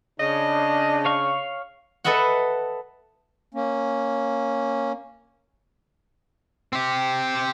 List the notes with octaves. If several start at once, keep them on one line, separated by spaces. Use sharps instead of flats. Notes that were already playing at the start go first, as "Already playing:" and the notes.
C#3 D4 D#5
C#5 F5 C#6
A4 B4 D#5 E5 F#5
A#3 C#4
C4 G4